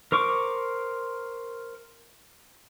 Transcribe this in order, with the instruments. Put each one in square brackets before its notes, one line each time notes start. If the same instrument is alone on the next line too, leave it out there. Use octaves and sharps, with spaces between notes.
[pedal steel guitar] A#4 C5 C#6 D6